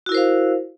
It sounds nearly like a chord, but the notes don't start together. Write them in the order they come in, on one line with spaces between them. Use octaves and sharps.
F#4 E4 A#4 C5 F5